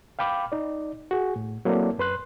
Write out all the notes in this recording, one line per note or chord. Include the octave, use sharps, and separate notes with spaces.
F5 G5 B5 D6
D#4 D5
F#4 G#4
A2
F#3 A#3 C4 E4 A4 D5
F#2 B4 C6 F#6